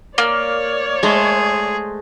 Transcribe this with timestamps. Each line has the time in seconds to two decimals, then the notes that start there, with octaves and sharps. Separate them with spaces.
0.18 A#3 C#5 D5
1.03 G#3 A3 G#4 C5